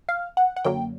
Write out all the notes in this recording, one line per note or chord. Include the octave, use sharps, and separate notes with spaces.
F5
F#5
F#5
F#2 D3 F#3 A#3 G5